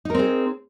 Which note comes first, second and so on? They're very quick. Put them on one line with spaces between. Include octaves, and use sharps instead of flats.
D#4 A#4 C4 G#4